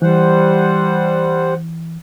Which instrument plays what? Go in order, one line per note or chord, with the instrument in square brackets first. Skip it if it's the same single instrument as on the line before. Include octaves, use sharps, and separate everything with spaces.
[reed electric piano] E3 [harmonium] G3 C5 F#5